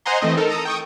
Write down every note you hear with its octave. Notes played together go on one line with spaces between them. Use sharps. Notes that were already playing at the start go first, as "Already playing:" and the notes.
C5 D#5 F#5 G#5 A#5 C6
E3 A3 C4 D#5
D#4 A4 A#4
A4 A#5 D#6
G5 C#6 D#6